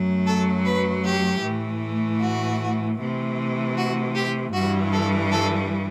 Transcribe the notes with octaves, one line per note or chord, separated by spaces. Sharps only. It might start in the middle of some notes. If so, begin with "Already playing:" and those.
Already playing: F#2 F#3 A3
A4
B4
G4
A2 E3 A3
F#4
C3 E3 A3
F#4
G4
G2 E3 G3 F#4
A4
A4